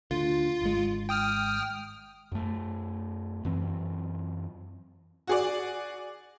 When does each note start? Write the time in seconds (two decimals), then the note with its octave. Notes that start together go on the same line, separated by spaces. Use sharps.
0.11 D2 D3 F4
0.62 G#1 G#3
1.09 G5 D#6 F6
2.32 F#2 A3
3.45 F#2 E3 C4
5.27 F#4 G#4 D5